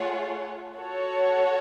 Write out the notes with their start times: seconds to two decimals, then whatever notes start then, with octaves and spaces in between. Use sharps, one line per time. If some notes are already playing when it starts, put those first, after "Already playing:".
Already playing: A3 F4 G#4 C#5 F#5
0.76 F#4 A4 C#5